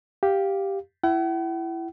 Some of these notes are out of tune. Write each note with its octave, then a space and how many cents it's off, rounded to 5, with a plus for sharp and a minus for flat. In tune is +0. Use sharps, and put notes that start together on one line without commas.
G4 +0 F5 +0
E4 +20 F#5 +45